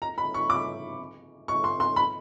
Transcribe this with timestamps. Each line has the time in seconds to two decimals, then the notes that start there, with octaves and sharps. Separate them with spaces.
0.02 A#5
0.18 B5
0.34 C#6
0.50 D6
1.48 C#6
1.64 C6
1.80 C6
1.96 B5